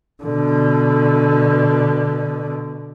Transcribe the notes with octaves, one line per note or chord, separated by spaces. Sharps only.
B2 D3